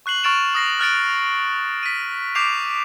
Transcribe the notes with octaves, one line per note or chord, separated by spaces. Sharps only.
C#6 F#6 C7 F#7
C#6 F6 A6 D7 E7 F7
D#6 A#6 C7
F6 F#6 A6 D7
B6 D#7
D6 G6 C7 D7 E7 F7